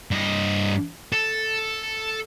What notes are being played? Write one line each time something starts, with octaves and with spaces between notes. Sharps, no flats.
G2 D#5
A4